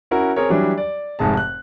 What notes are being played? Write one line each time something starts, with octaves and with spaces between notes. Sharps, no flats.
C#4 E4 F#4 A#4
C4 G#4 A#4 C#5
E3 F#3 G3 D4 G4
D5
F1 G#2 C3 G#4 A5
F#6